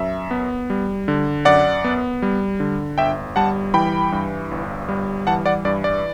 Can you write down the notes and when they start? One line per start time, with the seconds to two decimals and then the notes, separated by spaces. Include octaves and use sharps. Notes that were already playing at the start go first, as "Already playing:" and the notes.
Already playing: F#2 E5
0.31 B3
0.70 G3
1.08 D3
1.45 F#2 D5 F#5
1.84 B3
2.22 G3
2.60 D3
2.98 G1 E5 G5
3.36 G3 F#5 A5
3.74 E3 G5 B5
4.12 G2
4.51 G1
4.89 G3
5.27 E3 F#5 A5
5.46 D5 F#5
5.65 G2 D5
5.84 D5